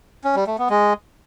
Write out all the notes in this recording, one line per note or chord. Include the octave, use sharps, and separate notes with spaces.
C#4
G3
A3
B3
G#3